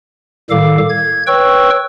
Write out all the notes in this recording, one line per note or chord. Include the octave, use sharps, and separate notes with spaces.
A2 D#3 G3 A4 F5 D6
G#6
B4 C#5 G5 C#6 E6